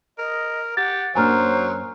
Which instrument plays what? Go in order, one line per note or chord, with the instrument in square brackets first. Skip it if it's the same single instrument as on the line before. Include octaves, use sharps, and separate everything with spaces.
[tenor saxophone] A#4 [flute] D#5
[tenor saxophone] G4 [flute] F#5 [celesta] A6
[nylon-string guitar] F#2 A#3 D4 [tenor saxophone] F#3 [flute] C5 [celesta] G#5 A#5 F6